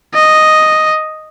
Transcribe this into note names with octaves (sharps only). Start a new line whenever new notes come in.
D#5